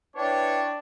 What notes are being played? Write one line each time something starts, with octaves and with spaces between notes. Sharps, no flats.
D4 E4 B4 C#5 G5